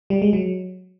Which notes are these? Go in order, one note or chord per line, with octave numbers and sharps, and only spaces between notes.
G3
G#3
F#3